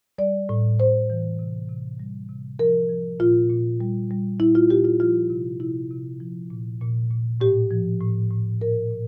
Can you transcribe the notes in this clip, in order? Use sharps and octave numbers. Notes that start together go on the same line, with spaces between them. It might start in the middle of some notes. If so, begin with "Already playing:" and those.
G3 D5
A2
A2 C5
E3
C3
C3
G3
C3
F3 A#4
F3
A#2 F4
A#2
G3
G3
A#2 E4
F4
A#2 G4
F4
F3 F4
C3
C3 E4
C3
F3
A#2
A#2
A#2
A2 G4
F3
A2
A2
A#2 A#4
A#2